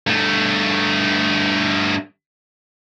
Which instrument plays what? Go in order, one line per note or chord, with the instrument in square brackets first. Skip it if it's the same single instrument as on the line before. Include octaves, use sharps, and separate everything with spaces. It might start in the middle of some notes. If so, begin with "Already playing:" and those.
[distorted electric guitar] G2 A3